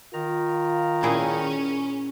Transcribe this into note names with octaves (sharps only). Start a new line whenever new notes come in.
D#3 F4 A#5
A#2 C#4 E4 G#4